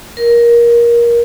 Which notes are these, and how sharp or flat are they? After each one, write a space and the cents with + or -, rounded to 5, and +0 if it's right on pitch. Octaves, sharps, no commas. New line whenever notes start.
A#4 +20